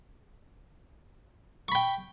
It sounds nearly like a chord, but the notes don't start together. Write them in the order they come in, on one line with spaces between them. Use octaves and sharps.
C#6 B5 G5